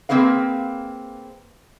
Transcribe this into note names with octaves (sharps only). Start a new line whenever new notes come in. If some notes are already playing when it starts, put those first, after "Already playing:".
A#3 C4 G#4 B4 F5